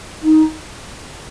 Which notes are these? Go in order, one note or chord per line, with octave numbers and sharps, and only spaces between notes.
D#4